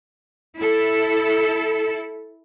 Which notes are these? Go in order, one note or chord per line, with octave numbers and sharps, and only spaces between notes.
E4 A4